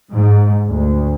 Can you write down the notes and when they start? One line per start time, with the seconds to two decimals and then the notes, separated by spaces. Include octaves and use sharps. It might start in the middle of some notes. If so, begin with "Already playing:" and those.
0.11 G#2
0.69 D2